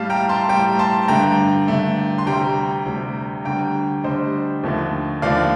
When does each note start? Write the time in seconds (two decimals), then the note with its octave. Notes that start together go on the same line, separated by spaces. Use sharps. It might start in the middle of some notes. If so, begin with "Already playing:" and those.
Already playing: A2 G3 F5 A5
0.10 G5 A#5
0.29 A5 C6
0.49 A2 G3 G5 A#5
0.79 A5 C6
1.08 G2 D3 A3 G5 A#5
1.68 G2 D3 A3
2.18 C6
2.26 D2 C3 G3 G5 A#5
2.86 D2 C3 G3
3.45 D2 D3 G3 G5 A#5
4.04 D2 D3 G3 C5 D#5
4.63 D#2 D3 F3 A3
5.22 D#2 D3 F3 A3 D5 F5